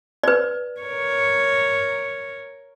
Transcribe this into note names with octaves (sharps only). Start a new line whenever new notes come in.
B4 D5
A#4 C#5